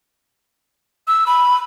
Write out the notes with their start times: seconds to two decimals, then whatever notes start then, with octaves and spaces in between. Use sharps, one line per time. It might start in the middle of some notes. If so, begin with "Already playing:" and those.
1.08 E6
1.27 B5